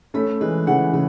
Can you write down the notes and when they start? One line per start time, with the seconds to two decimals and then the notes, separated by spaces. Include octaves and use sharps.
0.14 A3 C#4 B5
0.40 E3 G#3 B4
0.67 C#3 E3 F#5
0.93 C#3 B4